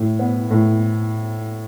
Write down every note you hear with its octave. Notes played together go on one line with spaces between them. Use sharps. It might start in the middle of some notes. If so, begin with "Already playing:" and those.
Already playing: A2
B3
A2